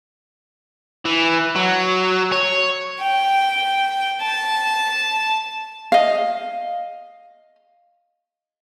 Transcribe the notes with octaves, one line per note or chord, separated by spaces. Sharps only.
E3
F#3
C#5
G5
A5
D#5 F5